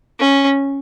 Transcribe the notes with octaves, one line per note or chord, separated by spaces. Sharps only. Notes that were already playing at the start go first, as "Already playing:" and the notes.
C#4